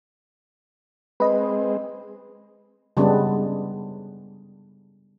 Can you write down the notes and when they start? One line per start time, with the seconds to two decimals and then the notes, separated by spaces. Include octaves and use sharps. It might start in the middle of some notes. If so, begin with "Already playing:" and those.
1.20 G#3 C4 B4 D#5
2.97 C#3 G3 G#3 B3 D4